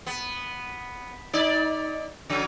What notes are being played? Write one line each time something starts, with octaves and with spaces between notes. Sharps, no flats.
B3
D#4 D5
C#3 F#3